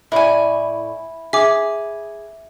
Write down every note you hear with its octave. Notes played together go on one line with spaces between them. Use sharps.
A2 E4 D5 G#5
G#4 E5 D6